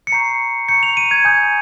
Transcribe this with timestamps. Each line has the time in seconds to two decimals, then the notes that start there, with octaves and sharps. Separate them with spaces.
0.07 C#7
0.12 A#5 C#6 G6 C7
0.69 A#5 C#6 G6 C#7
0.83 F7
0.97 D#7
1.11 G#6
1.25 G#5 D#6 G6